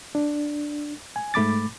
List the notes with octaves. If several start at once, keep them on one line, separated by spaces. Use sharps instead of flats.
D4
G#5
G#2 A3 B5 D6 A6